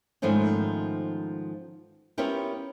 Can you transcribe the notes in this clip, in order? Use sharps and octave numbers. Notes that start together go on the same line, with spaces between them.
G#2 D#3 F3 A3 B3 C#4
B3 C#4 E4 F4 G4 A#4